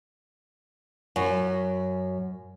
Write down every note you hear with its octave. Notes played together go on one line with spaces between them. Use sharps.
F#2